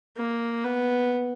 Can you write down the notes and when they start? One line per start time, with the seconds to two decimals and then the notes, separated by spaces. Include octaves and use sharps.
0.17 A#3
0.64 B3